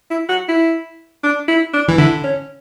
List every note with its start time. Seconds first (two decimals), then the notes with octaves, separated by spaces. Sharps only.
0.10 E4
0.29 F#4
0.48 E4
1.23 D4
1.48 E4
1.73 D4
1.88 E3
1.98 D3 E4
2.24 C#4